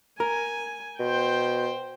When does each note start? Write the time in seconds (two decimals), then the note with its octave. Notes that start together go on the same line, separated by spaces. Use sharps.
0.20 A#4 G#5
0.99 B2 C5 G5